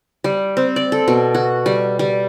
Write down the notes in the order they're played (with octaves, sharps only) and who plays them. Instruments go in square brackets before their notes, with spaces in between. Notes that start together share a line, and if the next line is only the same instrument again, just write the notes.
[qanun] G3
C4
D5
A4
B2
F#4
G3
G3